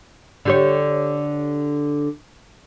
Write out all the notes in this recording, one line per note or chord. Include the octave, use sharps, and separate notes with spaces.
D3 G4 C#5